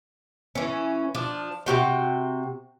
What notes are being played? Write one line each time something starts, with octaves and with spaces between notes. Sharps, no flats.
E3 C#4
F3 D4
C3 D#4 F#4 G5